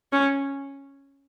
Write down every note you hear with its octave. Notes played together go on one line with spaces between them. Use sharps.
C#4